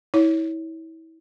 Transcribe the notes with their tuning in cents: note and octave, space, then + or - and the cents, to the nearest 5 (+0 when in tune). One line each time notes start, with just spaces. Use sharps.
E4 -30 C#5 +10